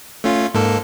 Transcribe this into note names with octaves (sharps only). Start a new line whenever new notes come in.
A3 C#4 F4
G#2 A#3 A4